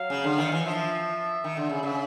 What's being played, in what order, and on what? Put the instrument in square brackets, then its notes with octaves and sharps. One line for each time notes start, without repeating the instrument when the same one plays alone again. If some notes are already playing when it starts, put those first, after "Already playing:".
Already playing: [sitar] F#3 [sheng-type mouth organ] F5
[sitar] C#3
D3
D#3
E3
[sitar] F3 [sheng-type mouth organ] E5
[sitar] D#3
D3
C#3
C#3